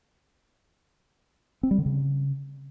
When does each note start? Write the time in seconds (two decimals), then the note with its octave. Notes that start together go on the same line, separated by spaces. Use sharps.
1.63 C4
1.71 G3
1.78 D3
1.86 C#3